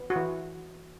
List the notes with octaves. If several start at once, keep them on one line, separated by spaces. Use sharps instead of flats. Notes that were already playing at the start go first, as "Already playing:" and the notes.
Already playing: B3
F#4
E3 E4